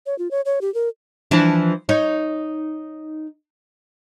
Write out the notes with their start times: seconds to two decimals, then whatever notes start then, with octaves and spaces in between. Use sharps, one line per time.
0.06 C#5
0.19 F4
0.31 C#5
0.45 C#5
0.61 G4
0.74 A#4
1.31 E3 F3 D4
1.89 D#4 C#5